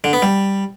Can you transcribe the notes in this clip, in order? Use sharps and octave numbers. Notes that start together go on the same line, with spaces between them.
D3
B3
G3